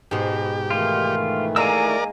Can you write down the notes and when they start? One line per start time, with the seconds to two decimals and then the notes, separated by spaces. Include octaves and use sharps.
0.11 G#2 B2 G4
0.70 D#3 E3 A3 F4
1.56 G#3 A#3 A#4 D5 F5 G#5 A#5 E6